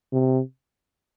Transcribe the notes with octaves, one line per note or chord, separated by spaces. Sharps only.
C3